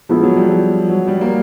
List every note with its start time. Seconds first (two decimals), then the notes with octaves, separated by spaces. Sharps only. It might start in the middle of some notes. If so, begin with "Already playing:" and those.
0.09 F3 G#3 B3 E4
0.23 F#3
0.36 G3
0.49 F3
0.89 F#3
1.08 G3
1.21 A#3